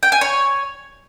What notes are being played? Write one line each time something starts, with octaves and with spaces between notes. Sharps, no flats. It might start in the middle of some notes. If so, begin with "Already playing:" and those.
G5
G#5
C#5